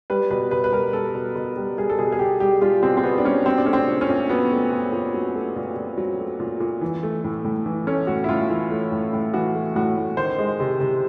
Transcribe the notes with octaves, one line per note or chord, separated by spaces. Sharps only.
G3 B4
B2 B4
B2 B4
B4
G3 A#4
G3 A4
B2
B2
G3
G3 G#4
A4
B2 G#4
G#4
B2 G4
G3 G4
G3 F4
B2 C4
C4
B2 B3
D4
G3 C#4
F#3 C4
D4
A3 C#4
C4
A#2
C#4
A#2
F#3 B3
A3
A#2
A#2
F#3
A3
A#2
A#2
F#3
A3
A#2
A#2
E3
A3
A2
A2
E3
A3 C#4
A2 F#4
E4
A2 F4
E3 E4
A3
A2
A2
E3 F#4
A3
A2 F#4
A2
D#3 C5
G#3
C3
C3